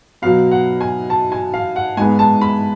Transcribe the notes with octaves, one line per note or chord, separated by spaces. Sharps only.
B2 F#3 B3 F5
F#5
G#5
A5
G#5
F5
F#5
G#2 G#3 B3 G#5
A5
B5